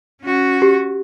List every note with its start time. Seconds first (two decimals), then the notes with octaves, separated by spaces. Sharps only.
0.22 C#4 F#4
0.62 G4